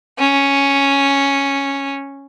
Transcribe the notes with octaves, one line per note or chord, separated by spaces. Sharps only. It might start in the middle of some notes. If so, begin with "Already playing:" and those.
C#4